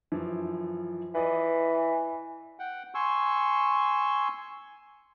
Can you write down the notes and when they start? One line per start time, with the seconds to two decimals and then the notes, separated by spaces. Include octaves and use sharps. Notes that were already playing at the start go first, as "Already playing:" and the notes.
0.12 F#2 E3 F3
1.15 E3 B4 D5 D#5
2.59 F#5 G5
2.95 G#5 C6 C#6 E6